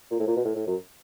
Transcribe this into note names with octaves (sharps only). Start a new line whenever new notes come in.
A#2
A2
A#2
B2
A2
A2
F#2